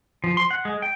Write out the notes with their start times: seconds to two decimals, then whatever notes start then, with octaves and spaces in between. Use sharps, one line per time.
0.24 F3
0.37 C6
0.51 F#5
0.65 G#3
0.82 G5